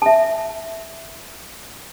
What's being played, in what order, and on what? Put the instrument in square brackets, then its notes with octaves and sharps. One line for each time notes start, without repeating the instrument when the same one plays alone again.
[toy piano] E5 A5